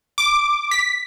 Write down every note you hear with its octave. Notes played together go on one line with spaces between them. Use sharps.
D6
B6